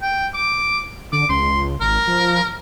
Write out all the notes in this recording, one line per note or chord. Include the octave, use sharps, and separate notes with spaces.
G5
D6
D3 D6
C#2 C6
G#1 A#4
F3